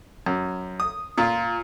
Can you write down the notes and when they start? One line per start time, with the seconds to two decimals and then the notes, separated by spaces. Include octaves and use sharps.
0.26 F#2
0.80 D#6
1.18 A#2 F4